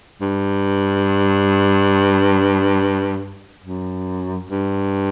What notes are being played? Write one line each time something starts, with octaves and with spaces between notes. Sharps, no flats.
G2
F#2
G2